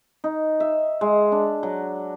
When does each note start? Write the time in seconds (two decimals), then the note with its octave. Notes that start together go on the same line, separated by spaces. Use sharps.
0.24 D#4
0.60 E5
1.01 G#3
1.32 D4
1.63 F#3